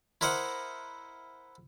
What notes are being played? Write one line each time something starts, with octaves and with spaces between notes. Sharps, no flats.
E4 A#4 C5 D#5 F#5